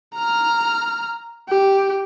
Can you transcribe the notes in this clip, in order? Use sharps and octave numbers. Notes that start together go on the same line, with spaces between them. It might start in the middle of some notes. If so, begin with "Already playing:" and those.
A#5 F6
G4